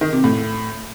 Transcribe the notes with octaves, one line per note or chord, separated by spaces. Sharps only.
D#3
C3
A2